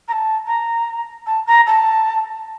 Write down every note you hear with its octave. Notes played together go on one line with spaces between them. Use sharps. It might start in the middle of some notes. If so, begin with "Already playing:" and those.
A#5
A5
A#5
A5
A#5
A5